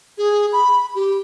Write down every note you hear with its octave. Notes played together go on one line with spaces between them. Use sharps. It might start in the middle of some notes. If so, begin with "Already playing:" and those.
G#4
B5
G4